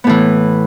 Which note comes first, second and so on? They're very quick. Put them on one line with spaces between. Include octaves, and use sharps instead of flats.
B3 A2 E3